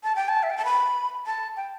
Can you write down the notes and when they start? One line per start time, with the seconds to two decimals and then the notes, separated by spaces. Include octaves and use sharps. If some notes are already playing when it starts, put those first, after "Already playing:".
0.04 A5
0.16 G5
0.29 A5
0.43 E5
0.50 G5
0.57 A5
0.65 B5
1.26 A5
1.57 G5